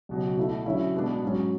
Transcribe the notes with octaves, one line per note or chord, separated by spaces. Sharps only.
C#2 B2 F#3
B2 A3 E4
D3 F#3 C#4 E4
B2 G#3 B3 D4
G#2 F#3 C#4